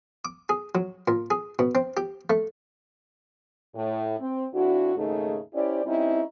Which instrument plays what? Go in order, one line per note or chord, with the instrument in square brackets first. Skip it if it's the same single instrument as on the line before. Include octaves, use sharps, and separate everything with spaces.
[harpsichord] D6
G#4
F#3
A#2
G#4
B2
C4
G4
A3
[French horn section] A2
C4
F2 D4 E4 F#4
D#2 G#2 C#3 A3 D#4 G#4
C#4 E4 G4 C5 D5
G3 C4 C#4 D#4 E4